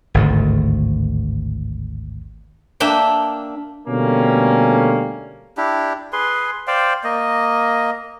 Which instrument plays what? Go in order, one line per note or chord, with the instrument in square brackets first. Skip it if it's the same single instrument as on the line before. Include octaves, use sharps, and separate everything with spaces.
[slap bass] G#1 D2 A2
[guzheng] A#3 D4 E5 G5
[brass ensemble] B2 D3 G3 A3 A#3 C#4
[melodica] D4 E4 G4
G#4 B4 C6
C5 D5 F5 G5
A#3 D#5